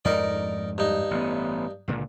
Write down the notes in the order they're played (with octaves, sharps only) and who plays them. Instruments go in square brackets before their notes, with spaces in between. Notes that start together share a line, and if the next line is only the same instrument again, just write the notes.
[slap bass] F2 G#2 [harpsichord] D#4 A#4 D5
[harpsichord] G2 D#4
[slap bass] A1 B3
C#2 A#2 D3